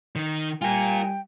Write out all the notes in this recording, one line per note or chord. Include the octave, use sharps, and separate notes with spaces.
D#3 D#4
G3 F4 A#4 G5 G#5